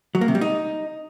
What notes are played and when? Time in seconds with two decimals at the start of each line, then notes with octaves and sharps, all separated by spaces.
0.15 F#3
0.21 A#3
0.28 C3
0.35 G3
0.41 D#4